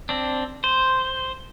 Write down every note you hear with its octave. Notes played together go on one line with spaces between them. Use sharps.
C4 D4
C5